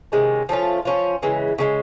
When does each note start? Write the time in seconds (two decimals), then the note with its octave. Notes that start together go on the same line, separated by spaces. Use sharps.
0.12 C3 D#3 G#3 C#4
0.49 F3 A3 C#4 F4
0.85 F3 A3 C#4 F4
1.23 C#3 E3 G#3
1.58 C#3 E3 G#3